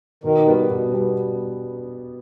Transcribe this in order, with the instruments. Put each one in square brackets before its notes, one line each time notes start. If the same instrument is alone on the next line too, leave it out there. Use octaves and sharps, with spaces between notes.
[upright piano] B2 [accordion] D#3
[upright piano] G3 B3
B2
G3 B3